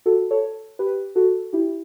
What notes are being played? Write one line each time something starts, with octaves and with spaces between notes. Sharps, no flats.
F#4 A4
A4 C#5
G4 B4
F#4 A4
E4 G4